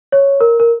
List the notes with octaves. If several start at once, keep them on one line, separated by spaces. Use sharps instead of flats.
C#5
A#4
A#4